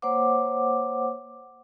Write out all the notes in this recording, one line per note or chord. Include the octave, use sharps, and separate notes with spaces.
A#3 C5 C#5 F#5 D6